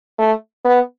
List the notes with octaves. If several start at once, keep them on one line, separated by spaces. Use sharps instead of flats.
A3
B3